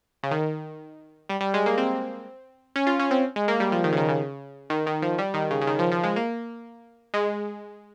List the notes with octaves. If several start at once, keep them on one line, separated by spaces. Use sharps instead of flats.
C#3
D#3
G3
G3
G#3
A#3
C4
C#4
F4
C#4
C4
G#3
A#3
G3
F3
D#3
C#3
D#3
C#3
D#3
D#3
F3
G3
D#3
C#3
C#3
D#3
F3
F3
G#3
A#3
G#3